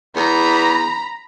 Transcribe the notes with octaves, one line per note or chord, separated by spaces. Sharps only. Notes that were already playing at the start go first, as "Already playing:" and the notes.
E2 A#5 B5